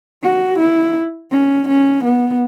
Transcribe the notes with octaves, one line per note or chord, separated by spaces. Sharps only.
F#4
E4
C#4
C#4
B3